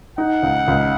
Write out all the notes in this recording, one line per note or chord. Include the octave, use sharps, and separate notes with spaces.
D#4 F#5
C#2
C#2